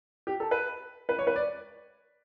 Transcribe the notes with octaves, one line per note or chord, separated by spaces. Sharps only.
G4
A4
B4
B4
C#5
B4
D5